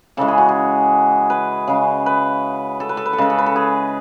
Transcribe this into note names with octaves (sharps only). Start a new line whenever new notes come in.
C#3 E3 G#3 A4
G#4
F#4
G#4
B4
C#3 G#3
B4
A4
B4
A4
B4
A4
C#3 G#3 B4
A4
B4
A4
G#4